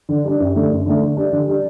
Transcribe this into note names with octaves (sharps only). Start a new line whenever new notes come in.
D3
G3 D4
F#2
D3 A3
F#2
D3 A3
D3
G3 D4
D3
G3 D4